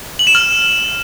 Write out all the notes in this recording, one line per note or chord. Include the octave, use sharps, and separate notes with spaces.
F#7
E7
F6